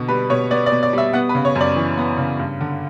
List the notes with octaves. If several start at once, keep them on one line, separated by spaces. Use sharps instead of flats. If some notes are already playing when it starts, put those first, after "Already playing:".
Already playing: B2 D3
G3 B4
B2 C#5
B3 D5
D5
B2
D5
G3 E5
B3 F#5
B4
C#3
C#5
F#2
D5
E3
B3
C#3
G2
D3